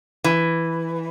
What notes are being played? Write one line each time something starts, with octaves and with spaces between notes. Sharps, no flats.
E3